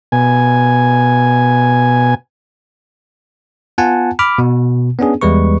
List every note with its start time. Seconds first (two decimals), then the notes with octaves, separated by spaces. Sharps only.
0.12 B2 G#5
3.78 B3 F4 F#5 G#5 A5
4.19 B5 D6 F6
4.38 B2
4.99 B3 C#4 D4 G#4
5.21 E2 G3 G#3 B4 C#6